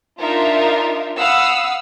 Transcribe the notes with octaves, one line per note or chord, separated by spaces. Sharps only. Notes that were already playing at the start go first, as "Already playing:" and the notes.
D4 D#4 F4 A#4 E5
F5 F#5 B5 D#6 E6